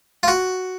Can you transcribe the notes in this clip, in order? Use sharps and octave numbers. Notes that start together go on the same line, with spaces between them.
F4
F#4